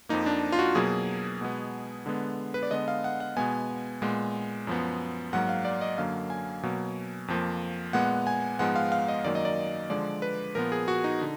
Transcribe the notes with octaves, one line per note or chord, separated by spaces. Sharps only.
F2 F3 A#3 D#4
D4
F4
F#4
B2 F#3 A#3 G#4
B2 G#3 B3
D3 G#3 B3
B4
D5
D3 G#3 B3 D#5
F5
F#5
F#5
B2 G#3 B3 G#5
A#2 G#3 B3
F#2 F3 B3
G#2 F#3 A#3 F#5
F5
D5
D#5
F#2 D3 F#3 A#3 F5
G#5
B2 F#3 A#3
F2 F3 A#3
A#2 G#3 B3 F#5
G#5
G#2 F3 G#3 B3 F#5
F5
F5
D#5
F#2 D#3 F#3 A#3 D5
D#5
D5
D3 F3 G#3 D5
B4
A#2 F3 B3 A#4
G#4
F#4
D#4
D3